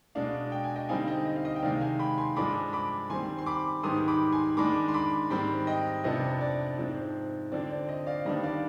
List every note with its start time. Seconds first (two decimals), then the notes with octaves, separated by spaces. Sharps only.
0.15 B2 G#3 D4 D5 F5
0.52 G5
0.64 G#5
0.76 D#5 G5
0.89 D3 G3 C4 D#4 F5 G#5
1.07 D#5 G5
1.25 D#5
1.36 F5
1.45 D#5
1.56 G5
1.63 C3 D#3 G#3 D5 F5
1.81 F5 G#5
1.99 G5 B5
2.18 G#5 C6
2.36 G2 F3 G#3 D4 B5 D6
2.73 B5 D6
3.10 D#3 G3 C4 G#5 C6
3.39 C6
3.46 B5 D6
3.83 G#2 D#3 G3 B3 C6 D#6
4.08 B5 D6
4.32 G#5 C6
4.57 D#3 G#3 D4 B5 D6
4.88 C6
4.94 B5 D6
5.30 G#2 D#3 G3 C4 G5 B5
5.67 D#5 G5
6.04 F2 C3 F3 B3 D4 D#5
6.41 D5
6.78 G#2 F3 C4
7.52 D3 F3 C4 D5
7.70 D5
7.89 D#5
8.07 D5 F5
8.25 D#3 G3 B3 D4 D#5
8.44 D5 F5